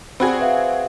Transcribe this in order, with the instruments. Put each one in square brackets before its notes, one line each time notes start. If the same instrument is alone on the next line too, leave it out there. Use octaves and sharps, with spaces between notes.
[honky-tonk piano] C4 F#4 G#4 [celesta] D5 F#5 B5
[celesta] B4 E5 F5